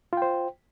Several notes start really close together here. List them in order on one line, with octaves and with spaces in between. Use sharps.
F4 G5 C5